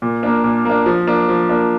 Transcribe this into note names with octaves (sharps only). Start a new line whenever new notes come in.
A#2
A#3 D4
A#2
A#3 D4
F3
A#3 D4
F3
A#3 D4